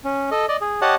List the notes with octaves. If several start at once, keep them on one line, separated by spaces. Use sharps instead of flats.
C#4
A4 D#5
D5 D#5
G#4
G4 C#5 D#5 F#5 A5